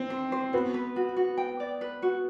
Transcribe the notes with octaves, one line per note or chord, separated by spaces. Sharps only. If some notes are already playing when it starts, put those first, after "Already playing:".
Already playing: C4
C5
C5
B3 F#4
B4
F#4
F#4
G5
D5
B4
F#4